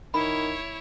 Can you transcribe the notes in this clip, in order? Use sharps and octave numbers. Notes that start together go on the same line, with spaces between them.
D#3 E4 C#5 B5